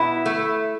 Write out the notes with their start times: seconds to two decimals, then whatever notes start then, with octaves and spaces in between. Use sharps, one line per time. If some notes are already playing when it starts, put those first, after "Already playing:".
Already playing: B2 B3 E4
0.26 A3